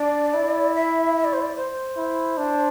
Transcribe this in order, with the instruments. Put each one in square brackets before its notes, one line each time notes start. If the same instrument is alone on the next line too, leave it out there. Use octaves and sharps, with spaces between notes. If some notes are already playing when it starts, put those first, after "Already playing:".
Already playing: [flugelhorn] D4 [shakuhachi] D5
[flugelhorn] E4
[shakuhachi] E5
E5
D5
C5
D5
C5
[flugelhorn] E4
D4